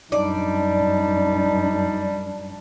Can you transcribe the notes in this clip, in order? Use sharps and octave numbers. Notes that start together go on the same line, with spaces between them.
F#2 G3 D4 D#4 D5